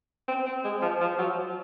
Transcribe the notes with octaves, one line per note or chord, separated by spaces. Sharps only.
C4
C4
G#3
F3
F3
F#3